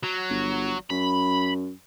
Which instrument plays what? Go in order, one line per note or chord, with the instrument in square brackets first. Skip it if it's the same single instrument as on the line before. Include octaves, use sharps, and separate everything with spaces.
[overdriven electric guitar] F#3
[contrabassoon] G1
[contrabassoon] F#2 [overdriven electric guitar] B5